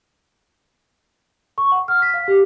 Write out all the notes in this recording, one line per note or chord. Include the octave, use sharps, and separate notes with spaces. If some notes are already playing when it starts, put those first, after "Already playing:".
C#6
F#5
F6
B6
F5
G4